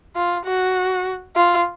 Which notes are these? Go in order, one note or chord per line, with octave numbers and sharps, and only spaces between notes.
F4
F#4
F4